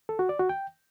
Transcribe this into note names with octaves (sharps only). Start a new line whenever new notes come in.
A4
F#4
D5
F#4
G5